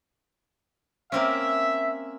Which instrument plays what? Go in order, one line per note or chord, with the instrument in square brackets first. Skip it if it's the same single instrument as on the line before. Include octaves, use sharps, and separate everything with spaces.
[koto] A#3 C4 C#4 [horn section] E5